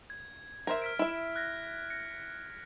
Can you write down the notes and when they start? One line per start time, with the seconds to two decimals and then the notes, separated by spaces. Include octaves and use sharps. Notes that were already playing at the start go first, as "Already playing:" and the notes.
0.10 G#6
0.67 A#4 C5 E5
0.82 F6 B6 D7
0.99 E4 E5
1.36 F#6 G#6 A#6
1.90 A#6 C#7